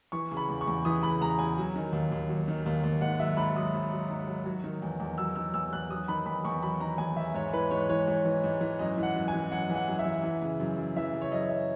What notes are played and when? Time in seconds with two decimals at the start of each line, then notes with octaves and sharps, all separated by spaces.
0.12 E3 C#6
0.31 C#3
0.37 B5
0.49 E2
0.61 C#6
0.67 E2
0.85 E3 D#6
1.02 C#3 B5
1.21 E2 A#5
1.39 E2 G#5
1.57 F#3
1.76 D#3
1.93 D#2
2.12 D#2
2.29 F#3
2.48 D#3
2.66 D#2
2.84 D#2
3.01 G#2 F#5
3.19 F#3 E5
3.37 G#2 B5
3.56 F#3 D#6
3.74 G#2
3.92 F#3
4.10 G#2
4.27 F#3
4.46 F#3
4.64 D#3
4.82 E2
5.00 E2
5.18 F#3 E6
5.36 D#3 E6
5.54 E2 E6
5.73 E2 F#6
5.90 F#3 D#6
6.08 D#3 B5
6.26 E2 B5
6.45 E2 C#6
6.62 F#3 B5
6.80 D#3 A#5
6.98 E2 G#5
7.17 E2 E5
7.34 G#2 C#5
7.53 E3 B4
7.71 G#2 C#5
7.89 E3 C#5
8.08 G#2
8.25 E3
8.44 G#2
8.61 E3
8.79 F#2 D#5
8.97 E3
9.03 F#5
9.15 F#2
9.28 G#5
9.33 E3
9.51 F#2 F#5
9.69 E3
9.75 F#5
9.88 F#2
9.99 E5
10.05 E3
10.24 E3
10.42 C#3
10.59 F#2
10.78 F#2
10.96 E3 E5
11.13 C#3
11.21 C#5
11.32 F#2 D#5
11.49 F#2 E5